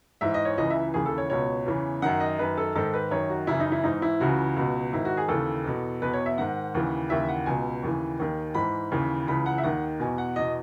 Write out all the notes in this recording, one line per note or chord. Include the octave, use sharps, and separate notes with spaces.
G#2 E3 E5
D#5
C#5
C#2 C#3 E3 D#5
E5
D#2 C#3 E3 G#4
A4
C#5
C#2 B2 C#5
E2 C#3 E3
F#2 D#3 F#5
D#5
F#2 D#3 B4
A4
G#2 D#3 A4
B4
F#2 D#3 C#5
F#4
F#2 C#3 E3 E4
D#4
E4
G#2 E3 D#4
E4
C#2 C#3 E3 F#4
C#2 B2
G#2 D#3 E4
F#4
G#4
D#2 C#3 E3 A4
E2 B2
E2 B2 B4
C#5
E5
G#2 D#3 F#5
D#2 C#3 E3
D#2 C#3 E3 E5
F#5
C#2 B2 G#5
D#2 C#3 E3
D#2 D#3
G#2 E3 B5
D#2 C#3 E3
C#2 C#3 E3 B5
F#5
E5
D#2 D#3 F#5
E2 B2 G#5
F#5
E2 B2 D#5